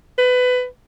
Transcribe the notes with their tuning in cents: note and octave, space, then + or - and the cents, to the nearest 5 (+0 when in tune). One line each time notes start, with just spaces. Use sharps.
B4 +20